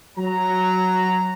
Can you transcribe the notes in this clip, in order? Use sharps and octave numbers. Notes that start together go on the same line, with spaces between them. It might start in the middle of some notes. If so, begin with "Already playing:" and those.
F#3 A#5